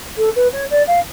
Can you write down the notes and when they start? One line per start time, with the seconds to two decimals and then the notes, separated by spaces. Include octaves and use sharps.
0.17 A4
0.35 B4
0.52 C#5
0.70 D5
0.87 F5